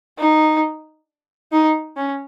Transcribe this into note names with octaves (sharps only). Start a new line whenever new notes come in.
D#4
D#4
C#4